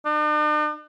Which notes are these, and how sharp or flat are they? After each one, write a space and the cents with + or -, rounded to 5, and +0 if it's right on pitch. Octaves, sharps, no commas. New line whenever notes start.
D4 +45